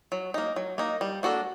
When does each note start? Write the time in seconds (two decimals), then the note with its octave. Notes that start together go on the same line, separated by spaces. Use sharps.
0.12 F#3
0.34 A#3 D#4
0.56 F#3
0.78 A#3 D#4
1.01 G3
1.23 A#3 D4 F#4 A4